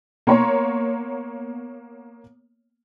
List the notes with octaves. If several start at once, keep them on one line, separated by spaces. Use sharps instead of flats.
A#3 B3 C#5 A#5 C6 C#6